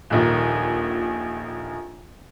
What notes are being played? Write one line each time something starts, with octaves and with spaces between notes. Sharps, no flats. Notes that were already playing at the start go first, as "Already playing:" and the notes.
D#1 A#1 D#3